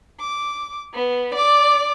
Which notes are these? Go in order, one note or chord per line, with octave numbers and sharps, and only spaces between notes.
D6
B3
D5 D6